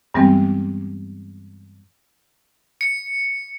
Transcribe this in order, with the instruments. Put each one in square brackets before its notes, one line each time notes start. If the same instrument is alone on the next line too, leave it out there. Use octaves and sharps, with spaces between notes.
[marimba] G2 E3 G3 G#3 B3 C4
[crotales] C#7